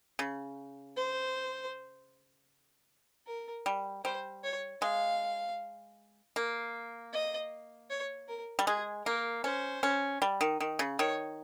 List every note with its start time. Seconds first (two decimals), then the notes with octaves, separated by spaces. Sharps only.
0.19 C#3
0.97 C5
3.27 A#4
3.66 G3
4.04 G3 C5
4.44 C#5
4.81 G#3 F5
6.36 A#3
7.13 D#5
7.90 C#5
8.29 A#4
8.59 G3
8.67 G#3 G#4
9.05 A#3 A#4
9.44 C#4 C5
9.83 C#4
10.22 G3
10.41 D#3
10.60 D#3
10.79 C#3
10.99 D#3 C#5